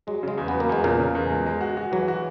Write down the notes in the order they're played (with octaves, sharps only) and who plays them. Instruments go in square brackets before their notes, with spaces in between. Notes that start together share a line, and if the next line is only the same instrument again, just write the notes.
[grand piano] F#3 [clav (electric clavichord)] G#3
[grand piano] C#3 [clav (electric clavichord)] G#3
[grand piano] E2
[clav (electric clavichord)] B3
[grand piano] F#3
[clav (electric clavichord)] A#3
[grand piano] E2 [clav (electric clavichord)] G#3
[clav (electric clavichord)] A#2 A#3 [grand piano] C#3
[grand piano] C#3
E2
G#3
G#3
F#4
F#4
[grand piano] E3 [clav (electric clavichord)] F#3
[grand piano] F#4